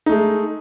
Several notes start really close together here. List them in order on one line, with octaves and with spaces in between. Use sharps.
D#4 A3 G#3